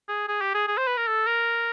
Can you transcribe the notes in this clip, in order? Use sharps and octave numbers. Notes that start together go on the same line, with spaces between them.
G#4
G#4
G4
G#4
G#4
C5
B4
A#4
A4
A#4